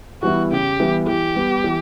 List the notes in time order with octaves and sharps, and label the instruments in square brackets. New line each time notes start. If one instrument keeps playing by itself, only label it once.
[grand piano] E3 G3 B3 E4 [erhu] F#4
[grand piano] C#3 [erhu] G4
[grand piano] E3 G3 B3 E4
[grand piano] E3 [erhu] G4
[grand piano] G3 B3
E3